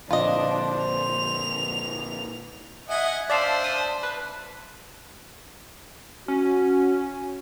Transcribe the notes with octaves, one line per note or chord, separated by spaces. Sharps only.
A#2 D3 F3 D4 F4 C5 D#5
F7
D#5 E5 F#5 G#5
D4 C5 D5 E5 F5 A5
D#6
B4
C#4 F#4